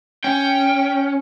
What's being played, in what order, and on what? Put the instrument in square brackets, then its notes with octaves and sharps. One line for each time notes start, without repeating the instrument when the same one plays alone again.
[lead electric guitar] C#4 [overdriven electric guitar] G5